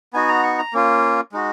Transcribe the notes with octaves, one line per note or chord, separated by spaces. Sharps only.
B3 D#4 F#4 G#5
A#5
C#6
A#5
A#3 C#4 F4
G#3 D#4 F#4